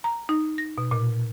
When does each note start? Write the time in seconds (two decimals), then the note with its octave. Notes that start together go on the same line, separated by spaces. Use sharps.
0.04 A#5
0.29 D#4
0.58 A#6
0.78 B2
0.91 A#2